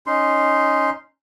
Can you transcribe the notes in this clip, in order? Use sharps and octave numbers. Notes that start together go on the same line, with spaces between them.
C#4 D#4 C6